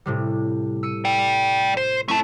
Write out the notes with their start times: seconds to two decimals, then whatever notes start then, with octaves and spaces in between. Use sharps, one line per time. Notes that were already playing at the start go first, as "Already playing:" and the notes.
0.06 A2 C3 G3
0.83 E6 C#7 D#7
1.05 D5 G5
1.77 C5
2.08 A3 C4 C#4 E4 A5